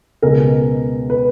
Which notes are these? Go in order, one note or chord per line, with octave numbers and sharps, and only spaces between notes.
C#2 B2 G#3 A#4
B4